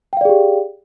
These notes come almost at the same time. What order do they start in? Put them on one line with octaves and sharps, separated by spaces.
G5 F5 D5 G#4 G4